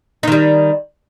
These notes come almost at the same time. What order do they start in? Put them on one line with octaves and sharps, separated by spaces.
D#4 D#3 G3